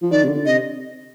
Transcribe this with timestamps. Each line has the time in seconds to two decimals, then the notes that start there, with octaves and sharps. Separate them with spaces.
0.02 F3
0.11 D#3 D5
0.24 C3
0.28 D3
0.46 C3 D#5